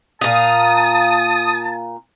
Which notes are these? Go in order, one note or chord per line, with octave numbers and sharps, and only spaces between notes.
A#2 F5 A5 D#6